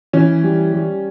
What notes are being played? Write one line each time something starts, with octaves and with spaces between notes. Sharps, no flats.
E3 C#4
G3
G3